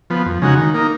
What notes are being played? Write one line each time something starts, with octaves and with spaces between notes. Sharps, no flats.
F3 B3
F2
C#3 G#3 D#4 F#4
D#3
A#3 D#4